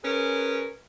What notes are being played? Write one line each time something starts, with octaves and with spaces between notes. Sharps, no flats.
C#4 G#4 A#4 B4